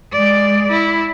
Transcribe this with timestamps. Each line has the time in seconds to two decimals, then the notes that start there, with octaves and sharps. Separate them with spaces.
0.12 G#3 D5
0.71 E4